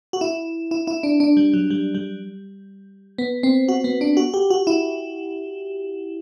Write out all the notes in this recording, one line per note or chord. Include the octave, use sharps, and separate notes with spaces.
F#4
E4
E4
E4
D4
D4
G3
F#3
G3
G3
B3
C4
F#4
B3
D4
F#4
G4
F#4
E4